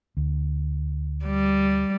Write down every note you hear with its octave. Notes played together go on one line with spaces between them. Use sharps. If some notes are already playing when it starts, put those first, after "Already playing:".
D2
G3